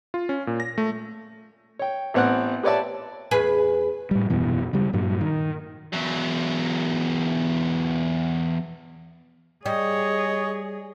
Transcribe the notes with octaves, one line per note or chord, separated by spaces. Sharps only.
F4
C#4
A#2
A#6
A3
C#5 G5
A1 B3 C4 F#5 F#6
G4 B4 C#5 D5 E5 A5
E2 G#4 B4
A2 G3
D#1 F#2 B2 E3
C#3 G3
G2 A#2 F#3
D#3
E2 F#3
G3 G#4 C#5 D#5